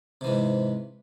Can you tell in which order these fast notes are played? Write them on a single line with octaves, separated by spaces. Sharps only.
C3 E3 G#2